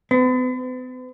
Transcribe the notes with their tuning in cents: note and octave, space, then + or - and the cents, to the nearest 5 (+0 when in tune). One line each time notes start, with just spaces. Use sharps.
B3 +45